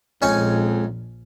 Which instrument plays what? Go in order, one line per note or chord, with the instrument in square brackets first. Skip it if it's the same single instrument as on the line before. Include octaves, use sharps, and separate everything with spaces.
[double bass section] A#1 [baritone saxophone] F2 [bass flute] G#3 [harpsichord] C#4 D#4 G#5